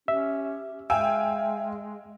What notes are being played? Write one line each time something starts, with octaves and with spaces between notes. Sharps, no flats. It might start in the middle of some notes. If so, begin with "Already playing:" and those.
C#4 G4 E5
G#3 E5 F5 G5 G#5 E6